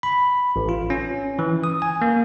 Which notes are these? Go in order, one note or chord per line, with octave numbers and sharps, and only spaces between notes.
B5
A1
F4
C#4
E3
D#6
G#5
A#3